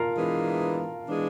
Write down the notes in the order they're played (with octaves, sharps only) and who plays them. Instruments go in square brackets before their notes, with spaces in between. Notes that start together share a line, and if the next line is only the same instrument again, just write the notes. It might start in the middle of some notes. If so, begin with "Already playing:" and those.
Already playing: [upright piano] F4 A#4 F5 A5 A#5
[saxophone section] E3 G#3 B3 D4
E3 G#3 B3 D4